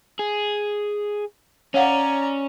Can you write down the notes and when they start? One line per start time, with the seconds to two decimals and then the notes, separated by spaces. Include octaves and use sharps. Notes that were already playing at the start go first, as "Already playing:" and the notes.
0.19 G#4
1.74 C#4 C#5 D5 F5 F#5 A#5